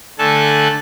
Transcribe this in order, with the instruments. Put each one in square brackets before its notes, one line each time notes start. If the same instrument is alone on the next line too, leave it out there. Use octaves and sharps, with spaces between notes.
[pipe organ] D3 A3 A4 G#5 A5 F#6